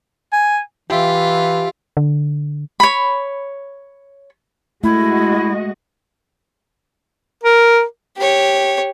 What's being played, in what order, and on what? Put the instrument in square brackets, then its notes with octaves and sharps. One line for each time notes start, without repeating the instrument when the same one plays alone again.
[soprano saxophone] G#5
[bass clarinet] E3 [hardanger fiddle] F4 [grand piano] G4 E5
[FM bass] D3
[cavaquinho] C#5 B5
[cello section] G#3 F#4 D#5 [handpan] A3 [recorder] E4
[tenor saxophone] A#4
[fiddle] G4 C#5